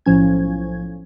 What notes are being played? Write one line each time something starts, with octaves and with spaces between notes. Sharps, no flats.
B1 A2 F3 C#4 G#6